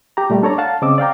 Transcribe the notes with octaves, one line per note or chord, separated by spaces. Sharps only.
G4 A#5
A#2 G3 A3
D4 A4 C#5 D5 A#5
F5 F#5 A5
C#3 C4 D#5 D6 E6
D5 F5 G5 A#5